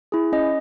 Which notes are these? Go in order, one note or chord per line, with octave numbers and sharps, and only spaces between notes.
E4 G#4
C#4 D#5